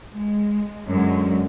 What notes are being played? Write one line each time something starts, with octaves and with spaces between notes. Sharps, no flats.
G#3
F#2 D3 G#3